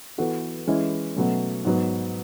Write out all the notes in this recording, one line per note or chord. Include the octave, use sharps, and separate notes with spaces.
E3 B3 F#4 A4
E3 G#3 C#4 E4
B2 F#3 A3 C#4
G#2 F#3 B3